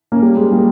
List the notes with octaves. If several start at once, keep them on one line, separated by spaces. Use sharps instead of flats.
A#3 C#4
G3
G#3
G3 A#3